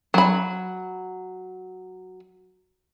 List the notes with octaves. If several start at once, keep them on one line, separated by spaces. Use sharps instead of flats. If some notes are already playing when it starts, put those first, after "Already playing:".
F#3 B5